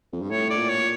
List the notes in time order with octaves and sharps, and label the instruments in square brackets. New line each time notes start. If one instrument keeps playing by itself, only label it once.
[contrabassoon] F2
G2
[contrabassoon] A2 [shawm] C#5
[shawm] D5
[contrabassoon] A#2
[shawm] C#5
[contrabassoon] A#2